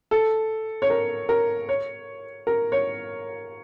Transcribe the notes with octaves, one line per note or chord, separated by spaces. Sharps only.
A4
C#5
A#4
A#4
C#5
A#4
C#5